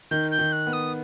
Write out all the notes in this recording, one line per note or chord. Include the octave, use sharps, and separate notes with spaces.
D#3 G6
G6
D#3
F#6
B3
D#6